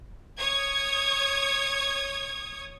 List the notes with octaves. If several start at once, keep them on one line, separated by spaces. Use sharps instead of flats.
C#5 D#6 G#6